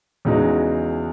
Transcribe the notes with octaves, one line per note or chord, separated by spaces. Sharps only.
E2 C#3 G#3 D#4 F#4